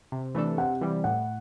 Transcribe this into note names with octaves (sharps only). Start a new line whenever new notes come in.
C3
E3 A3 D4 A4
C3 F#5
E3 G3
A2 F#5